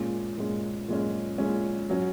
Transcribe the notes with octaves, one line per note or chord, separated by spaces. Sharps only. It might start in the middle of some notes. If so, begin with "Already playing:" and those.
Already playing: A#2 G#3 C#4
A#2 G#3 C#4
A#2 G#3 C#4
A#2 G#3 C#4
F#3 C#4